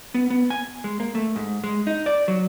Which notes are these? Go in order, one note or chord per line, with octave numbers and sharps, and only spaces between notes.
B3
B3
G#5
G#3
A#3
A3
G#2
G#3
D#4
D5
F#3